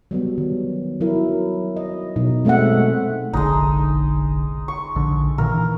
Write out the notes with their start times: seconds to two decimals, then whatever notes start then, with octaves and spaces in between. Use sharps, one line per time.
0.11 F#3 G3 B3
0.38 D#3
1.01 F#3 E4 A#4
1.77 D#5
2.16 B2 F#3 D#4
2.45 G#3 A3 C4 E5 F#5
3.33 F1 A#1 D3 G#3 D#4
4.68 C#6
4.96 A#1 D3
5.38 A#2 D#3 E3 A#4